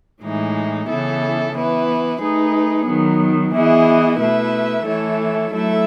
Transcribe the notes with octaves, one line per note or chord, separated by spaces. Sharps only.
A2 E3 G#3 D#4
C#3 E3 B3 E4 A4
E3 B3 E4 B4
A3 D#4 G#4 B4
D#3 F#3 B3
E3 B3 E4 G#4 D#5
B2 A3 E4 B4 E5
E3 A3 E4 A4 C#5
F#3 A3 E4 A4 E5